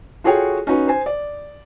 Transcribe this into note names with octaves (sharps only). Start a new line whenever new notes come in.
F4 F#4 G#4 A4 C#5 G5
C#4 D#4 F#4 B4
C5 G#5
D5